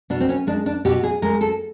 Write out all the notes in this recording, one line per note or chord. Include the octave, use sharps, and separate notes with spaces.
B2 D4
C4
C#4
G#3 D4
D4
B2 G4
G#4
G#3 A#4
A4